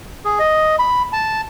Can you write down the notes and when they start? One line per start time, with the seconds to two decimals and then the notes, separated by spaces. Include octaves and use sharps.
0.25 G#4
0.39 D#5
0.79 B5
1.13 A5